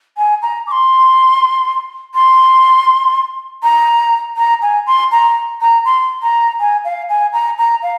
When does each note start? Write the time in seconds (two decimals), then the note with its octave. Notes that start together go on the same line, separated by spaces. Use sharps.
0.17 G#5
0.42 A#5
0.67 D6
0.71 C6
2.14 C6
3.63 A#5
4.37 A#5
4.62 G#5
4.87 C6
5.12 A#5
5.61 A#5
5.85 C6
6.22 A#5
6.60 G#5
6.85 F5
7.09 G#5
7.33 A#5
7.58 A#5
7.83 F5